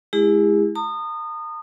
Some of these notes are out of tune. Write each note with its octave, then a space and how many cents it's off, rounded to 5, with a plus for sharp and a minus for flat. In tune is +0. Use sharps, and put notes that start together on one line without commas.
G#3 +30 E4 +0 G#4 -45
A#5 -45 D#6 -25